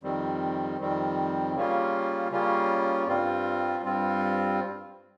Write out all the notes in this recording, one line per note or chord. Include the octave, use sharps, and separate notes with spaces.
F2 D#3 G3 C4
F2 D#3 G3 C4
C#3 G3 A#3 C#4 F4
C#3 G3 A#3 C#4 F4
G2 G3 C4 F4
G2 G3 C4 F4